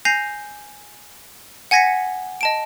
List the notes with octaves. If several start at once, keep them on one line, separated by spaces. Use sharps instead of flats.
G#5 G6 A#6 C7 F7
F#5 G#5 G#6 A#6 B6 C#7
D#5 A5 D7